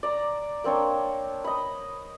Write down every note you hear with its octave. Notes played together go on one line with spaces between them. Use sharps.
D5 A#5
A#3 C4 D4 C#5
D#5 B5